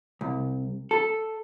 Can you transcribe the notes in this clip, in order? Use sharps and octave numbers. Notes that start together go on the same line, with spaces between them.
C2
A4